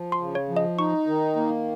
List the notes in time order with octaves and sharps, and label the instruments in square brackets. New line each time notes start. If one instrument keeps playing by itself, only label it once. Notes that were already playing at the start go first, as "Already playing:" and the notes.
Already playing: [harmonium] F3
[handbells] C6
[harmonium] C#3
[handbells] C#5
[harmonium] F3
[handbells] D#5
[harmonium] D#4 [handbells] C#6
[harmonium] D#3
A#3